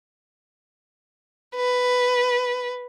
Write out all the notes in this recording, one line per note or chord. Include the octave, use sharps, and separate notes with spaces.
B4